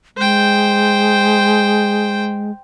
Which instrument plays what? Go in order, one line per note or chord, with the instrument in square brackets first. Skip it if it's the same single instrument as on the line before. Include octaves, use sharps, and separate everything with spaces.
[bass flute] G#3 [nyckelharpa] C5 G5